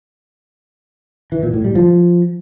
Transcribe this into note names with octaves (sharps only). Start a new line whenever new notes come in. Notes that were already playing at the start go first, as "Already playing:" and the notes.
E3
A#2
A2
G3
F3